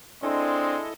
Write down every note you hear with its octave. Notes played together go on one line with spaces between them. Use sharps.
G#3 C4 D4 E4 A4 D#5